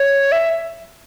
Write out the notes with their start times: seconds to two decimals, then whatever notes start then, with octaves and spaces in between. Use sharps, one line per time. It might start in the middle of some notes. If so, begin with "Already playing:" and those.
Already playing: C#5
0.32 E5